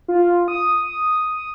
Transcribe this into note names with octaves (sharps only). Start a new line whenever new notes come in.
F4
D#6